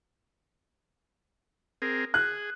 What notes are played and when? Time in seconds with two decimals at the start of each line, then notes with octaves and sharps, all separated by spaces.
1.82 C4 G#4 A#4
2.14 G#4 F#6